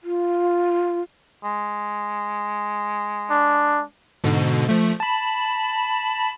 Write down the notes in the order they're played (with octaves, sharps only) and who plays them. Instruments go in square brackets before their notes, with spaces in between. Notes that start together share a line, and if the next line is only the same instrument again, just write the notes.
[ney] F4
[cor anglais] G#3
[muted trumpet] D4
[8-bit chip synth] G#2 B2 D3
F3 A3
A5 B5